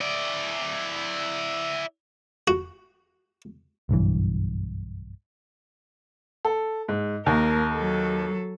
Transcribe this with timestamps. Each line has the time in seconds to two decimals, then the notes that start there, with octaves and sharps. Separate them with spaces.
0.01 E4 D5
2.48 F#4
3.89 F#1 B1 G2 E3
6.45 A4
6.88 G#2
7.26 D#2 A#3 A#4
7.74 F#3 A4